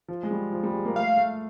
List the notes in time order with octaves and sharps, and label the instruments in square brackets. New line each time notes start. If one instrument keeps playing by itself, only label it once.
[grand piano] F3
G#3
G3
F3
G3
G#3
A#3
[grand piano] A3 [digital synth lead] F5
[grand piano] A3